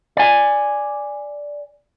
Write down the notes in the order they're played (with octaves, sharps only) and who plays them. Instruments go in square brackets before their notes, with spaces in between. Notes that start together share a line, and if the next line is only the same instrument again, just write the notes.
[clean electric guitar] D5 G#5